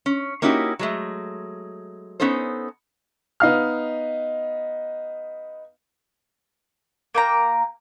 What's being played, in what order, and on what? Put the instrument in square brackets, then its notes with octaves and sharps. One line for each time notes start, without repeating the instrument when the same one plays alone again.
[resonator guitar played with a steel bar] C#4
A#3 C#4 D#4 E4 F#4 G4
F#3 G#3 A3
B3 C#4 D#4 A4 C5
[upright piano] B3 D#4 F5 F6
[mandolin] A#3 G5 A#5